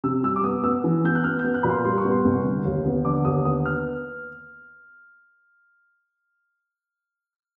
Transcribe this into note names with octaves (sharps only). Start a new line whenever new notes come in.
C3 E6
G3 E6
D6
B3 D#6
B3 E6
E3
B3 G6
F#6
B3 F6
G6
B3
F#6
A#2 B5
C6
G3 C6
C#6
B3
C6
C2
D3
D#2
B3
D3 D6
D#2 D#6
B3 D#6
F6